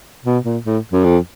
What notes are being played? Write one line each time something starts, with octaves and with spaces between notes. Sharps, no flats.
B2
A#2
A2
F#2
F2